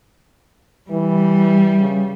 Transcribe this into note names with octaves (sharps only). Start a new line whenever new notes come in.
E3 G3
C#3